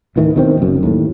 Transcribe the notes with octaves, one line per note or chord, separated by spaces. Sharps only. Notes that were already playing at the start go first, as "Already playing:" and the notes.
D1 A2 D#3 E3
B2 D#3 C4
F#1 F#2
D#2 A2